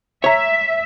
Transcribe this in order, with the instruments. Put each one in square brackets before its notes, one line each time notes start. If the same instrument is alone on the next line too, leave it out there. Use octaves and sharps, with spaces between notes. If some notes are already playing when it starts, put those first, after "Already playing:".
[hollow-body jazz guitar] C#5 A#5 [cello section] E5